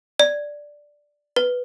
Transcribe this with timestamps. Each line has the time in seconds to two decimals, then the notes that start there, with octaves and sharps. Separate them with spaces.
0.20 D5
1.36 B4